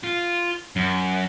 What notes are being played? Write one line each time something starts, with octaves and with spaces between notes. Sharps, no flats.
F4
F#2